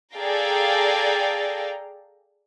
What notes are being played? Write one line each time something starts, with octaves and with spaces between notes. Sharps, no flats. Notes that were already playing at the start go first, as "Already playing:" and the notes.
G#4 A4 D5 F5 G5 A#5